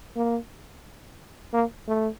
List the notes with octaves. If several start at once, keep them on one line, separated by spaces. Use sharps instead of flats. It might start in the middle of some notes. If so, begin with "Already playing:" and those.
A#3
A#3
A3